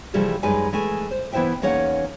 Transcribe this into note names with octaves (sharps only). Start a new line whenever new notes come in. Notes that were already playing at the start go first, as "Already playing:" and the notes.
C3 E3 F3 G3 A3 G#4
F#2 G3 G#3 D#4 B4 G#5
E3 G#3 A3 G#5
C5
E3 B3 E4 C5 E5 G5
E2 A#3 C#4 D#4 C#5 F#5